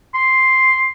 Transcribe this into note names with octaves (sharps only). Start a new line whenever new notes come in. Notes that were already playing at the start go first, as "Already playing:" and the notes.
C6